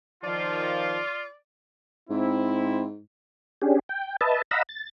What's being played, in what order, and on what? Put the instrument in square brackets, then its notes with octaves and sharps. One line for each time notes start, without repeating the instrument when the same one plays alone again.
[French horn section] D#3 F3 [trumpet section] F4 [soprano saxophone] D5
[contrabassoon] G#2 [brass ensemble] C4 E4
[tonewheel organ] C#4 D4 G4 G#4
G5
B4 D#5 E5 A5
D#5 F5 F#5 A#5 B5 E6
A6